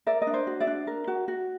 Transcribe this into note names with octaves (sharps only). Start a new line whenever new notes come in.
A#4 D5 E5
D#5
D4
C5 D5
F#4
D5 E5
D4
A#4
F#4
F#4